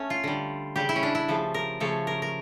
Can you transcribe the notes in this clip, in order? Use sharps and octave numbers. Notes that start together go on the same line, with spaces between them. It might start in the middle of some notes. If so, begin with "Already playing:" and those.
Already playing: A3 C#4
F4
D3 G3
C#3 G3 G4
E4
C#4
D4
E4
C#3 F3 A3
A#4
C#3 F3 A3 C#5
A#4
A#4